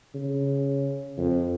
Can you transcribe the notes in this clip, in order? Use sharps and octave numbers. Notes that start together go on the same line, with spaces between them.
C#3
F2